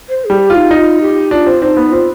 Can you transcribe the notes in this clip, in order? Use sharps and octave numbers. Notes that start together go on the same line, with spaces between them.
C5
G3 G#4
G4
D#4 F4
D#4 F4
G4
D4 F4
C4
C4 D#4
B3
C4 F4